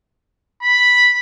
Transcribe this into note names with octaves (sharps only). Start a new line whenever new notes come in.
B5